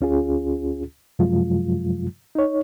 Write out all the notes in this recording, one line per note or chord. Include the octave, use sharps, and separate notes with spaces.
D2 C#4 F4 G#4
F#2 C3 F3 F#3 G#3 F4
D#4 C#5